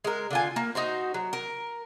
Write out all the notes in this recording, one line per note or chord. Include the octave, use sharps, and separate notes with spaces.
G#3 A#4
D3 F4 G#5
A#3
D#4 F#4 C5
F#3
A#4